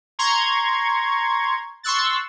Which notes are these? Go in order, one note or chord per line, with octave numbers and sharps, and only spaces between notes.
A#5 C6 C#6 G#6
C6 C#6 E6 F#6 A6